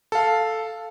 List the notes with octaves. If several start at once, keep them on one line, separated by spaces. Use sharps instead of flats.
A4 F5